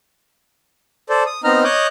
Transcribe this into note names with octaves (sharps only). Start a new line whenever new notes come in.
A4 C5 D5
D#6
B3 C4 D#4 D#5 A#5 F6
C#5 D#5 D6 D#6 F#6 G6